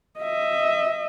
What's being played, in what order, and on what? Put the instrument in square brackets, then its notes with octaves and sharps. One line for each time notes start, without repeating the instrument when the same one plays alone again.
[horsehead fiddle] D#5 E5